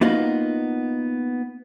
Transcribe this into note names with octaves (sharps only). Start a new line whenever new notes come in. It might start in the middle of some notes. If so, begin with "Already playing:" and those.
A#3 B3 D#4 F4 F#4